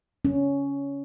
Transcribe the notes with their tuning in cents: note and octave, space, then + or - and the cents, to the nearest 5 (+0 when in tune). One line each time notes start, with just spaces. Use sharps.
C#4 +10